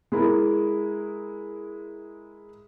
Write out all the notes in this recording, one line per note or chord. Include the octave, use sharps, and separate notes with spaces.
G#3 E4 A#4